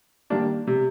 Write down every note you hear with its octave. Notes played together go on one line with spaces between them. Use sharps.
D#3 G3 A#3 D4
C3